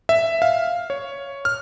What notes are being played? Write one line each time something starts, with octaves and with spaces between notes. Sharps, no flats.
E5
F5
C#5
F6